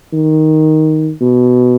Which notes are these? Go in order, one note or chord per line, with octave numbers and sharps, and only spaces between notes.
D#3
B2